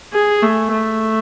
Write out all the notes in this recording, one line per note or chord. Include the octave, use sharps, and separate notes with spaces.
G#4
A3
A3